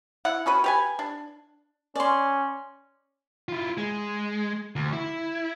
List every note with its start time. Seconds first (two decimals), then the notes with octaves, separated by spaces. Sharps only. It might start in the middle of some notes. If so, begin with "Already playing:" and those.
0.25 E4 F#5
0.46 C#4 F#4 B4
0.64 G4 B4 G#5
0.99 D4
1.95 C#4 D5 C6
3.49 E4 F4
3.78 G#3
4.76 D2
4.93 E4